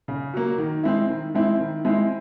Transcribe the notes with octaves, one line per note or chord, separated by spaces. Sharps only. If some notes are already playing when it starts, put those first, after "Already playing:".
C#3
F#3 A#3
D#3
G#3 C4 E4
D#3
G#3 C4 E4
D#3
G#3 C4 E4